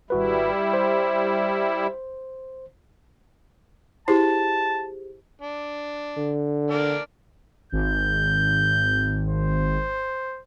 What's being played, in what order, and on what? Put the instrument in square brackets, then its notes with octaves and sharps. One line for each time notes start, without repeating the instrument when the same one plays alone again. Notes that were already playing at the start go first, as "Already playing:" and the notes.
[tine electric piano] G#1 F#4 B4 [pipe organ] G3 E4
[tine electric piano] C5
[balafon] E4 [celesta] G4 G#4 C5 [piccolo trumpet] A5
[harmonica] D4
[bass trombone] D3
[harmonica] D4 A#4 D5
[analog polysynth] G#1 [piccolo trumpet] G6
[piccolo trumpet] C5